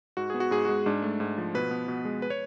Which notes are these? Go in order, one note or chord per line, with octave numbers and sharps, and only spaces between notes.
G#2 F#4
B3 G#4
F#4
G#2 G#4
G#3 F#4
G#2 D4
A3
G#2
F3
B2 B4
B3
B2
G#3
B4
C#5